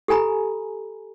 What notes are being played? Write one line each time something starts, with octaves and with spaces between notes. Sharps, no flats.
G4 A4 G#5 A#5 B5